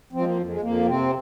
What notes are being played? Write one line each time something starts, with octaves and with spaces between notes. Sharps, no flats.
F3 C4
G#3
A#3
F2
G#3
F2 A#3
C3 C4